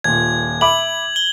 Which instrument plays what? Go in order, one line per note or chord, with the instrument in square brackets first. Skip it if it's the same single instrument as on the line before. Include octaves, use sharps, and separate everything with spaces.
[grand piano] D#1 A#2 [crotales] G#6
[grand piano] E5 B5 D6 [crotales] F#7
[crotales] G7